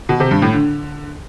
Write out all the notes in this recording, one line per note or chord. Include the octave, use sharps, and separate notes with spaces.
B2
C3
G2
A2
D3